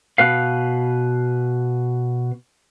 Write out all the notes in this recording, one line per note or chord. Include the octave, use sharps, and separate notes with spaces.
B2 B4 F5